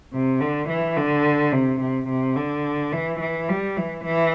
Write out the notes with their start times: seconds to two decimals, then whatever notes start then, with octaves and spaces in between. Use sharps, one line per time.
0.13 C3
0.41 D3
0.69 E3
0.97 D3
1.52 C3
1.80 C3
2.08 C3
2.36 D3
2.92 E3
3.20 E3
3.49 G3
3.77 E3
4.05 E3